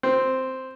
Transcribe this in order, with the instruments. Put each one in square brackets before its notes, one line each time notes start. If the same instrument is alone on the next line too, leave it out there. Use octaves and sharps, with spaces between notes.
[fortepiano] C4